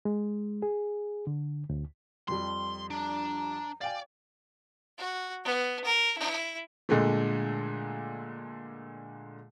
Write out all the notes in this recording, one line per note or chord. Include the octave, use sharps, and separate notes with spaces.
G#3
G#4
D3
D2
F2 F3 G3 C6
D4 A#5
D5 F5 G5 G#5
F#4
B3
A#4
E4
A#2 D3 G#3 A3